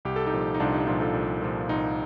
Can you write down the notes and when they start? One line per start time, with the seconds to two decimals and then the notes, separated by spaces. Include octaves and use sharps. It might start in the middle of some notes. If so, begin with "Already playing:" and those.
0.05 C2 G4
0.16 A4
0.26 D#4 G4
0.33 A#2 F3
0.54 D#4
0.60 C2 D4 F4
0.73 D#4
0.87 A#2 F3 D4 F4
1.01 F4 A4
1.14 C2
1.42 A#2 F3
1.69 C2 D#4